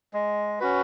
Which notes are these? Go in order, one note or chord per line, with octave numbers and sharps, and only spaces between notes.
G#3
C#4 F#4 B4